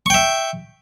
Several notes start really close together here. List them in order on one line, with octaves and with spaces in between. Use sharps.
C#6 G5 E5